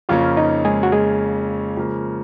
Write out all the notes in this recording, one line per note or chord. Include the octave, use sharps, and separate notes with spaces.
F2 C#3 F3 A#3 C#4 F4 F5
D#4 D#5
G#3 G#4
F#4
G#3 G#4
C#3 F3 A#3